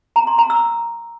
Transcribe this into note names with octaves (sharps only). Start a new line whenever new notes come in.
A#5
C6
A#5
E6